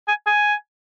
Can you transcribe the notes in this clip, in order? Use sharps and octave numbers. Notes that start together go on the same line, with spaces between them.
G#5
G#5